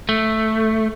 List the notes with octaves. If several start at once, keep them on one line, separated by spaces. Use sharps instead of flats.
A3